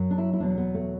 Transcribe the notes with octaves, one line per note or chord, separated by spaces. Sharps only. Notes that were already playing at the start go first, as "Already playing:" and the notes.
Already playing: F#2 F#3
D4
E4
E4
E2 B2 F#3 D4
B3
A3